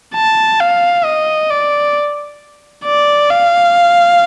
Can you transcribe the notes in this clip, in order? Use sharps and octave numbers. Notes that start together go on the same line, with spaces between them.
A5
F5
D#5
D5
D5
F5